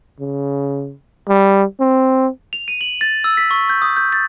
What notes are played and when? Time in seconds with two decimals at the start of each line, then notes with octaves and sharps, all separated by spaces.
0.20 C#3
1.29 G3
1.80 C4
2.53 F7
2.68 D#7
2.81 F#7
3.01 A6
3.24 E6
3.37 B6
3.51 C#6
3.69 G6
3.82 D#6
3.97 G6
4.12 A6